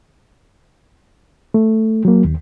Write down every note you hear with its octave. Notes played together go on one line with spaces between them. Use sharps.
A3
F#3 A#3
D#2